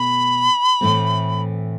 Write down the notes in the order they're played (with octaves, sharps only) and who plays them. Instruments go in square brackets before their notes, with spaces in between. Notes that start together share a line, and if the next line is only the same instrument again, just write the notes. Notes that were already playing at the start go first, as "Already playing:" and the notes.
Already playing: [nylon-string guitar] B2 A3 [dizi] B5
[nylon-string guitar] A2 E3 A3 C4